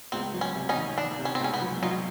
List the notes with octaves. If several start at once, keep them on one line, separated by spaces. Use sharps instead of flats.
C#2 C4
F#3
C#4
C3
C#4 D#4
D#3
D#3 D4
C3
C#4
C4
C#2 C#4
B3
F#3
F#3 D#4 F4